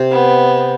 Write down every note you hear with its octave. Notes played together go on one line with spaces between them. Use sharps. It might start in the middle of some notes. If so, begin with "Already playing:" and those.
Already playing: C3
B3